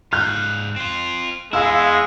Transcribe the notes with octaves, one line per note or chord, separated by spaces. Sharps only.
G#2 F5 F#6 G6
C4 F4
G#3 B3 E4 F5 E6